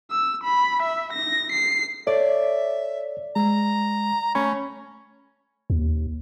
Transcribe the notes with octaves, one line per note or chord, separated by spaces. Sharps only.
E6
B5
E5
A#6
C7
A4 C#5 D5 E5
G#3 A#5
A3 C#4 A#5 B5
D#2